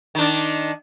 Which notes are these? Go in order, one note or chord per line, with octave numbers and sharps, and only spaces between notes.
D#3 D4